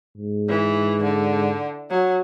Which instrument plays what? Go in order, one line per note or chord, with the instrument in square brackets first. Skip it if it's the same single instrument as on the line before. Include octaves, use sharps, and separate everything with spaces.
[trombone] G#2
[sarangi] E3
D3
F#3